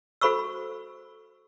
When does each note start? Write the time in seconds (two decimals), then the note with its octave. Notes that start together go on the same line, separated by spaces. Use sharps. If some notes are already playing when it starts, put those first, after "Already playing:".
0.21 F#4 A4 C5 B5 C#6 E6